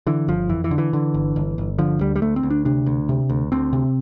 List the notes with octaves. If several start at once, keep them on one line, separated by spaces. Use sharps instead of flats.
D3 E3
G1 F3
F2 E3
E3
D3
E3
D3
G1
G1
G1
D3 F3
D2 G3
G3
D2 A3
C4
D2
D4
C3 D4
D2
C3
D2
D2 C4
C3